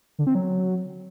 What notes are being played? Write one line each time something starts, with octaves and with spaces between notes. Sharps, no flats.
D3
C4
F#3